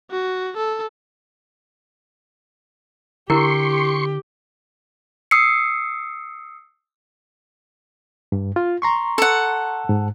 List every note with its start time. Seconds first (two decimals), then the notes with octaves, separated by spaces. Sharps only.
0.11 F#4
0.57 A4
3.30 D3 E4 G4 A#4 C6 C#6
5.31 D#6 E6 C7 C#7
8.32 G2
8.56 F4
8.82 A#5 C6 C#6
9.18 A4 F#5
9.89 G#2